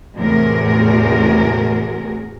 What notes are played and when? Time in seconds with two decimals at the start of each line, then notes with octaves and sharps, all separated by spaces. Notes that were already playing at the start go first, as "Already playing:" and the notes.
0.15 E2 A2 C3 F#4 G#4 A#4